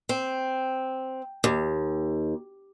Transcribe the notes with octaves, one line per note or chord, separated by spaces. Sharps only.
C4
D#2